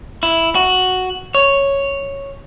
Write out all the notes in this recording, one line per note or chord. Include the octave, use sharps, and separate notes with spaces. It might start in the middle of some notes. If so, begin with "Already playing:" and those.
E4
F#4
C#5